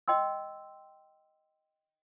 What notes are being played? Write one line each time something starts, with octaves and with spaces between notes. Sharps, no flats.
D#5 G5 C6 E6